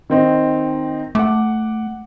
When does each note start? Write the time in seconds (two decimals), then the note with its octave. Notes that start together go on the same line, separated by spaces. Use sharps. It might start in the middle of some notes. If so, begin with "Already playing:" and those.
0.10 D#3 C4 D#4
1.15 A3 F#5 D6